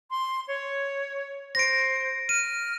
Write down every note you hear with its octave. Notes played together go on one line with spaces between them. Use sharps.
C6
C#5
C5 A#6 D7
F6 D#7